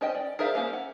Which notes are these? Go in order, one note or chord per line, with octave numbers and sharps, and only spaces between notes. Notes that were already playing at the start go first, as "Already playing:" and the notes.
C#4 C5 D#5 G5
D5
G#4 A#4 C5 E5 F5
A#3 C#4 C5 F5
F#5